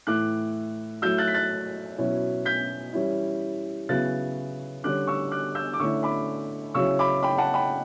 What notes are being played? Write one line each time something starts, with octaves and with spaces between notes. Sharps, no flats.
A2 E3 A3 D6 F#6
F#3 A3 E4 E6 G6
F#6 A6
B6
F#6 A6
B2 F#3 C#4 E4
G6 B6
E3 G3 C#4 E4
C#3 F#3 B3 E4 F#6 A6
D3 G3 C#4 D6 F#6
C#6 E6
D6 F#6
E6 G6
D6
D3 A3 C#4 E4 C#6 E6
B5 D6
C#3 F#3 C#4 E4 C#6 E6
B5 D6
G5 B5
F#5 A5
G5 B5